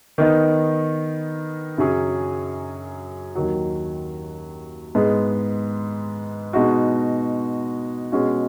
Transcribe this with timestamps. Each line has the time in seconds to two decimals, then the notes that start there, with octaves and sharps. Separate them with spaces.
0.18 D#3 B3 D#4
1.78 F#2 C#3 F#3 C#4 G#4
3.35 D#2 D#3 F#3
4.95 G#2 G#3 B3
6.53 B2 G#3 D#4 F#4
8.12 B2 G#3 C#4 F#4